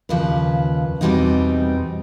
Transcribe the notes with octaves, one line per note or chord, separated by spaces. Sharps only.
D#2 C#3 F3 B4
E2 B2 G3 C4 D#4